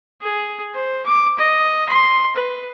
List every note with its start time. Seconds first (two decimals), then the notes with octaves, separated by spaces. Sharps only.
0.22 G#4
0.74 C5
1.06 D6
1.38 D#5
1.89 C6
2.36 B4